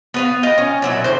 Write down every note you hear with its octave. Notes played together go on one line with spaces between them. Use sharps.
B3 B4 F5
F4 D#5 G5
C#4
A#2 F#3 E4
A2 D3 C4 C5